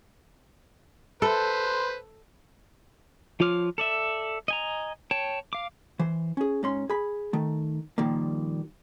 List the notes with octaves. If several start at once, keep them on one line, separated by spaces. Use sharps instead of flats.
A4 B4 C5
F3 F4 C#5 D6 F6
A4 D5 E5
D#5 G#5 A#5
C#5 G5 A5
F5 D6
E3 C5
C#4 G#4
G#2 C#4 C6
G#4 B5
D#3 A3
A#2 D#3 F3 G3 A#3